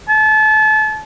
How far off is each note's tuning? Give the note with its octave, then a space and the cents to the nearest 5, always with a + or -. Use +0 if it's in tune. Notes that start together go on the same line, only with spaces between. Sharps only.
A5 -30